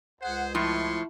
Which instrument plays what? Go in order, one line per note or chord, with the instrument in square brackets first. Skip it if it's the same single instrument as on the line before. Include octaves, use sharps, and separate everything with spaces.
[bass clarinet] C#2 [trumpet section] G#4 C5 [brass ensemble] F#5
[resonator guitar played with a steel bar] A2 F3 [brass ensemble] E4 [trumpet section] F4 C6 C#6